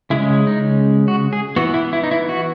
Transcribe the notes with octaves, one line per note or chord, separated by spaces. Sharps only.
C#3 G#3 C#4 E4
D#4
F#4
G#4
E3 B3 F#4
E4
E4
D#4
E4
F#4